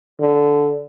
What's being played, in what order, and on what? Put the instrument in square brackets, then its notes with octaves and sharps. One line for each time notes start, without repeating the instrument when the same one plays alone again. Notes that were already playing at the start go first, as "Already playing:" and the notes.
[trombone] D3